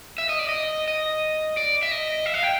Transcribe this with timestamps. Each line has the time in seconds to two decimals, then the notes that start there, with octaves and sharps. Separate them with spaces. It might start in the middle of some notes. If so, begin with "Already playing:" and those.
0.18 E5
0.29 D#5
0.39 D5
0.49 D#5
0.88 D#5
1.57 D5
1.83 E5
1.91 D#5
2.26 E5
2.34 F5
2.43 G5